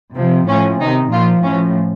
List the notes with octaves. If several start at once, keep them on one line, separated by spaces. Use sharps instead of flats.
C3 F3
A2 F3 C#4
C3 D#3 D#4
A#2 F3 F4
A2 F3 C#4